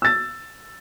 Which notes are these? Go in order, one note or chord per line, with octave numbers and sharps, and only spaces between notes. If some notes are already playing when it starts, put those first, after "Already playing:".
E6 A6